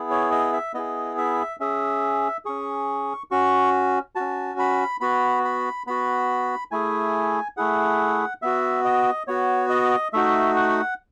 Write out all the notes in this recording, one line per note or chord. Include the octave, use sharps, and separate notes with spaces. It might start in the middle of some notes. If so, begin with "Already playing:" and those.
Already playing: B3 E4 G#4
C#5
D#5
E5
B3 E4 G#4 D#5
E5
C#4 G#4 E5
C#4 G#4 C#6
C#4 F#4 C#6
C#4 F#4 A5
B5
B3 F#4 B5
B5
B3 F#4 B5
A3 E4 G#4 G#5
A3 E4 G#4 F#5
B3 F#4 E5
D#5
B3 F#4 C#5
D#5
A3 D#4 F#4 E5
F#5